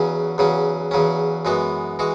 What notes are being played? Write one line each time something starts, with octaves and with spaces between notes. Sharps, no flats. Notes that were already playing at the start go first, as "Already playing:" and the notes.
Already playing: E2 C#3 F#3 C#4
E2 C#3 F#3 C#4
E2 C#3 F#3 C#4
F#2 E3 G#3 B3 F#4
E3 G#3 F#4